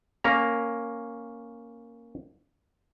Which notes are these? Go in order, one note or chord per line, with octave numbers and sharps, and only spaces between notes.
A#3 C#4 A#5